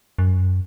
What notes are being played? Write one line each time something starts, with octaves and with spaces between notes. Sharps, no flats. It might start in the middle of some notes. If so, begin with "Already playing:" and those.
F#2